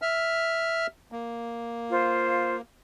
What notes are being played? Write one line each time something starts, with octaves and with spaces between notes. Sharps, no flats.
E5 F6
A#3
F4 C5